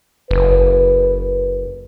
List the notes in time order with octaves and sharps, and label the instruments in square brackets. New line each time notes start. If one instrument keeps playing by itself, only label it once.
[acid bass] F#1 [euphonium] B4